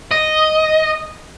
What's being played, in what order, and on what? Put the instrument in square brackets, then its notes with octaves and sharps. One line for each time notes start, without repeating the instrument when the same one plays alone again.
[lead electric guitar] D#5